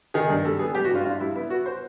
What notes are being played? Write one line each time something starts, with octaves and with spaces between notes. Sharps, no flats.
D#3 G#4
G2
G3 A4
B3 G#4
G3 G4
F#4
G2 F4
G2 F4
G3 E4
B3 E4
B3 F#4
C5